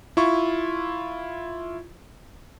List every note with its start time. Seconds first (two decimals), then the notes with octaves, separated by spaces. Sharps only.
0.17 E4 F4 C#6